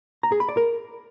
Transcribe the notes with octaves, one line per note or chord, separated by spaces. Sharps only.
A#5
G#4
B5
D5
A#4